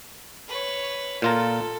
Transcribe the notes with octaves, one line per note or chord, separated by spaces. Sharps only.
B4 C#5
A#2 F4 A4 A#5